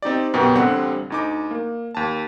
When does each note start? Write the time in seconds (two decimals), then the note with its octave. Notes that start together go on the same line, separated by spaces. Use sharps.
0.02 C4 D#4 G4 D5
0.34 F#2 B2 B3 G4 G5
0.55 A1 D3 G3 C4 F#5
1.10 D2 D#4 D6
1.51 A#3
1.95 D#2 A5